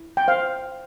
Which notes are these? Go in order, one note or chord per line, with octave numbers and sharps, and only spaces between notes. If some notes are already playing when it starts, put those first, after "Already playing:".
Already playing: E4
G5
C5 F5